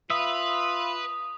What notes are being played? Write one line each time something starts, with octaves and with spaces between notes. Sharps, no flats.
F4 B4 E5 D#6